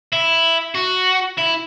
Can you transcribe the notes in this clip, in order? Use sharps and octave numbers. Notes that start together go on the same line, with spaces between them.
E4
F#4
E4